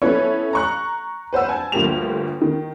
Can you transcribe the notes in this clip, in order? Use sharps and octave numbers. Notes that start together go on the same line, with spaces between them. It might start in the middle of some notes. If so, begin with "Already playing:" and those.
B3 C#4 E4 A4 B4 C#5
A#5 C#6 F#6
B4 C5 F#5 E6
G#5 A5
G1 D2 F3 A#3 G4 F7
D#3